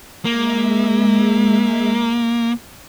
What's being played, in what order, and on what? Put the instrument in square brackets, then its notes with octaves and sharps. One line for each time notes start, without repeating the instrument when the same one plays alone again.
[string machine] G#3 E5 [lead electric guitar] A#3